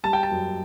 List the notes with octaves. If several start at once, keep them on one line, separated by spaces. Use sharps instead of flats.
G3 A5
G5
A5
F#2